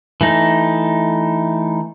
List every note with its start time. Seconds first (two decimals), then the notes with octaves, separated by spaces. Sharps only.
0.21 E3 A3 D#4